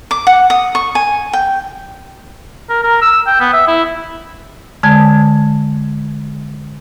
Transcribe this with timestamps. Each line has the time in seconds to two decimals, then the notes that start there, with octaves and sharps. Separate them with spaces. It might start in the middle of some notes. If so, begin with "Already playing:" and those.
0.11 D6
0.27 F#5
0.50 D#6
0.75 C#6
0.95 G#5
1.33 G5
2.70 A#4
2.84 A#4
3.02 E6
3.27 G5
3.41 B3
3.53 E5
3.68 E4
4.83 D3 G#3 A5 G#6